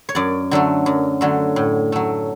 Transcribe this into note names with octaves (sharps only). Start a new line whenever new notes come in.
C#5
F#2 D5
D3 F#3 A3
F#2
D3 F#3 A3
A2
F#3 A3